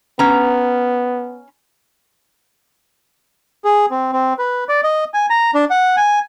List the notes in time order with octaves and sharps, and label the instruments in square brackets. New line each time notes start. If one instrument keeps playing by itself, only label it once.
[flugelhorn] B3 [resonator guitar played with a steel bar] C#4 A#5
[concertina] G#4
C4
C4
B4
D5
D#5
G#5
A#5
D4
F#5
G#5